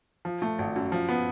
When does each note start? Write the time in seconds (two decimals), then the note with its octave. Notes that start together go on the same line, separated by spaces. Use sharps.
0.25 F3
0.42 A3
0.59 G#1
0.76 F#2
0.92 F3
1.09 B3